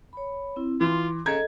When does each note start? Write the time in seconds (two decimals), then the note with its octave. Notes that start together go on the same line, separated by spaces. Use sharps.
0.13 C#5 B5
0.56 C4 E4
0.81 E3 F4 C6 D6
1.26 C#3 A4 D#5 A#5 G#6